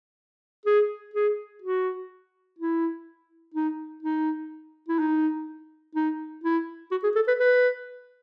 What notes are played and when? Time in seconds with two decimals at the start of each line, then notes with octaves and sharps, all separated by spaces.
0.66 G#4
1.14 G#4
1.62 F#4
2.59 E4
3.55 D#4
4.03 D#4
4.88 E4
4.99 D#4
5.95 D#4
6.44 E4
6.91 F#4
7.04 G#4
7.16 A4
7.28 B4
7.40 B4